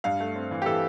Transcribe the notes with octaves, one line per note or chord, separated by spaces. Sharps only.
G2 F5
A3
C4
E3
G4
E3 A4